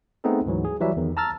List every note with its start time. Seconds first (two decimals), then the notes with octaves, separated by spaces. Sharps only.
0.24 A3 B3 C4 D#4 G#4 A4
0.46 D2 G#2 E3 F#3
0.64 G#4
0.81 E3 F#3 G3 E5
0.97 E2 D#3
1.17 A5 A#5 E6 F6 A6